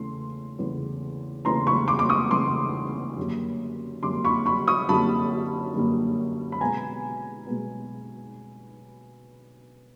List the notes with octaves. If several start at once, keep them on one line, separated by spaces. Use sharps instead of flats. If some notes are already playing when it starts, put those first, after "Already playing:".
Already playing: E2 C#3 E3 A3 C6
E2 C#3 E3 A3
E2 C#3 E3 A3 A#5 C6
B5 C#6
C6 D6
D6
C#6 D#6
E2 C#3 E3 A3 C6 D6
F#2 D3 G3 A#3
F#2 D3 G3 A#3 C6 D6
B5 C#6
B5 C#6
C#6 D#6
F#2 D3 G3 A#3 A5 B5
F#2 D3 G3 A#3
B5
B2 G#3 B3 G#5 A#5
B2 G#3 B3